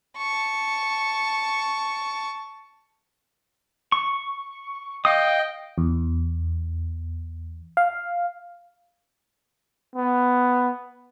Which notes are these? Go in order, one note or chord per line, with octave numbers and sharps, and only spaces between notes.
A5 C#6
C#6
D#5 F5 G5 D#6
E2
F5
B3